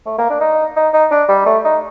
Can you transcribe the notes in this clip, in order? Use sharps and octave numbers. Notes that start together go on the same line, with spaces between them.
A3
A#3
D4
D#4
D#4
D#4
D4
G3
A3
D#4